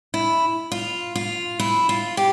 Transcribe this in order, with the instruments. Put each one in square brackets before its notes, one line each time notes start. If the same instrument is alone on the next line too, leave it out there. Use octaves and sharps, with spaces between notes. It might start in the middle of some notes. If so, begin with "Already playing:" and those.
[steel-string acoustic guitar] E4
F4
F4
E4
F4
G4